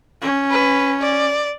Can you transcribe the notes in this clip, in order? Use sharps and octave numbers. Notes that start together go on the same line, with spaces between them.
C#4
B4
D5